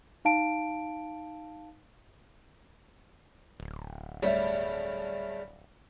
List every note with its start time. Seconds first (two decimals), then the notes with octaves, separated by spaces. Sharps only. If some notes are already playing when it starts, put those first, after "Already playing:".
0.25 D#4 F5 A5 D7
3.60 D1
4.22 G2 G3 A3 G#4 C#5 D5 E5